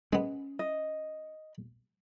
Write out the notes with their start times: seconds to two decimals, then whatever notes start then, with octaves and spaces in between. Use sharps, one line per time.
0.13 G#3 B3 C#4
0.59 D#5